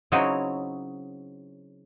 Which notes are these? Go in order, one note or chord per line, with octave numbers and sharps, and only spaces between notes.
C#3 F#3 C4 D#4 E4 C#5